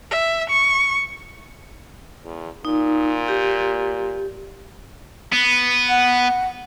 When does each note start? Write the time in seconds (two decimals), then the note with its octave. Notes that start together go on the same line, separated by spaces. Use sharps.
0.11 E5
0.50 C#6
2.24 E2
2.65 A#2 D#4
3.28 G4
5.33 B3
5.89 F#5